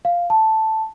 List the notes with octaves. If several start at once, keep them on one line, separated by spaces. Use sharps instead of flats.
F5
A5